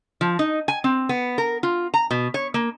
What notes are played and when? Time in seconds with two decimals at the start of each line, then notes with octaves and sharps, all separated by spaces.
0.21 F3
0.39 D#4
0.68 G#5
0.84 C4
1.09 B3
1.38 A#4
1.63 F4
1.94 A#5
2.11 B2
2.34 C#5
2.54 A#3